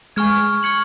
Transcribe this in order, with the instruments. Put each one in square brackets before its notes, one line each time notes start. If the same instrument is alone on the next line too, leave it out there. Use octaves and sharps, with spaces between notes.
[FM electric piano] G#3 [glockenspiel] G#5 C#6 F6 G#6
[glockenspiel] C#6 F6 G#6 C#7 F#7